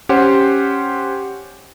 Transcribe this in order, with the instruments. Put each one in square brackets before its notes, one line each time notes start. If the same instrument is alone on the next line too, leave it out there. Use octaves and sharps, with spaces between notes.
[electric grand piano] C#4 G4 C5 C#5 F#5 C6